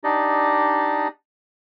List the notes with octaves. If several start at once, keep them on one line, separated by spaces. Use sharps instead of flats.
D4 D#4 G4 D5 D#5